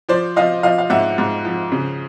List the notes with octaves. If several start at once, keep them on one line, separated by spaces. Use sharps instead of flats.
F3 C5 D5
F3 D#5 F5
F3 D#5 F5
F5
G#2 E5 F#5
G#2
F3
C#3